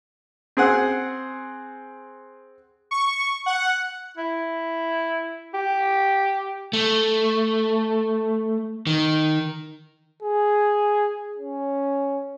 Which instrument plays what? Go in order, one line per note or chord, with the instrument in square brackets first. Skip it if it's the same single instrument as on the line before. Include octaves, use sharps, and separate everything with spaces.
[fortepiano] C4 G#4 F#5
[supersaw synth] C#6
F#5
[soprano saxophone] E4
G4
[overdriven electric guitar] A3
D#3
[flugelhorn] G#4
C#4